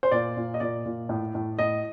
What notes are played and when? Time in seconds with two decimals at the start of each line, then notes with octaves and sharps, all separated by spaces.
0.03 C5
0.11 A#2 D5
0.37 A#2
0.54 D#5
0.60 A#2 D5
0.85 A#2
1.09 A2
1.35 A2
1.59 A2 D#5